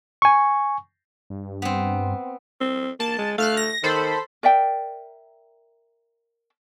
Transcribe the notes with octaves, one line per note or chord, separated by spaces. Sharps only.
G#5 C#6
G2
B3 C4
C4
A#3 A5
G#3
A3 F5 F6 F#6
A#6
D#3 A4 C5 B5
A#4 D5 E5 G5